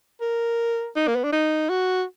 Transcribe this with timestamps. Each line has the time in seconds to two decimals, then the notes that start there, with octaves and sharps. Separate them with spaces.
0.21 A#4
0.96 D#4
1.08 A#3
1.16 B3
1.24 D4
1.32 D#4
1.69 F#4